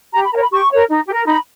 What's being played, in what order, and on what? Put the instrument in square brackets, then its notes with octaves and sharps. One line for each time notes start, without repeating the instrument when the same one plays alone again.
[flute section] G4 A#5
B5
A#4 C#5 A#5
B5
G4 C#6
A#4 C#5
D#4
G4
A#4
D#4 B5